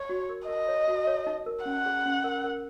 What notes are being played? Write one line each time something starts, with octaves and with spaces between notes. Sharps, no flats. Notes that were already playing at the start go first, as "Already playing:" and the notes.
Already playing: C#5
F#4
A#4
A#4 D#5
C#5
F#4
C#5
D#4
A#4
C#4 F#5
G#4
C#4
A#4
A#4